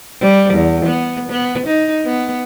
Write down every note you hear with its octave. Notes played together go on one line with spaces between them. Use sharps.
G3
E2
B3
B3
D#4
B3